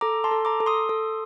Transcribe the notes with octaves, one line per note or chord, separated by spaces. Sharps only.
A4 A#5 D6
A5 C6
A4
A#5 D6
A4
C6 D#6
A4